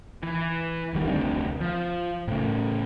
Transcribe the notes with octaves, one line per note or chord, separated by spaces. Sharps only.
E3
F#1 D#3 G3
F1 D2 C4 D4
F3
A2 C#3